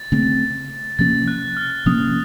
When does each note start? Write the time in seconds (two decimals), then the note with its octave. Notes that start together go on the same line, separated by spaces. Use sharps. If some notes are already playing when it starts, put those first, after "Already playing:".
Already playing: A6
0.12 C#3 A3 C4
0.99 C3 F3 A#3 C#4 A6
1.28 F#6
1.57 F6
1.86 C3 F3 A#3 C#4 D#6